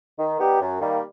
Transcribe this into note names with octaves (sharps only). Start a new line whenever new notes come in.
D#3
G3 B3 D#4 G4
F#2
D#3 G3 A#3